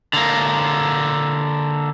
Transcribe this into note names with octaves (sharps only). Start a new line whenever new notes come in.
D3 A#3